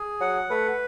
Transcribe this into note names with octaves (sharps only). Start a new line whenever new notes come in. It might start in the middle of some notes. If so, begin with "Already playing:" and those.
Already playing: G#4
F#3 F#5
A3 B4